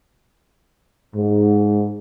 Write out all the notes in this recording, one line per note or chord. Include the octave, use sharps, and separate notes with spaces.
G#2